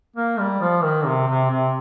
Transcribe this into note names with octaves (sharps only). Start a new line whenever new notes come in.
A#3
G3
F3
D#3
C3
C3
C3